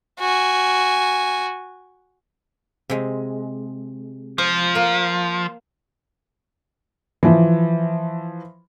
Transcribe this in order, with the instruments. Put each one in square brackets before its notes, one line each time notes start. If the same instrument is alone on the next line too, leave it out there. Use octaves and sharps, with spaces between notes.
[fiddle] F#4 G#5
[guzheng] C3 G#3
[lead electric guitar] F3 [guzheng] C5
[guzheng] A#3 A#4
[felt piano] E3 F3